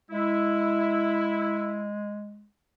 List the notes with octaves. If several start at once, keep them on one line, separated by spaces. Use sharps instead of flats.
G#3 E4